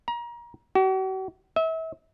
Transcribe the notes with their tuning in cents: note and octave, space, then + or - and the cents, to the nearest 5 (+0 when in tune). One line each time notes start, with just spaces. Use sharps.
A#5 +30
F#4 +45
E5 -35